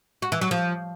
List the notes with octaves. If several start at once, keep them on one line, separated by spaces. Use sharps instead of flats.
F#4
E3
F#3
F3